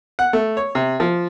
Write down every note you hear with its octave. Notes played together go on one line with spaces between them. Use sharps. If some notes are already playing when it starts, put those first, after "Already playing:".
F#5
A3
C#5
C3
F3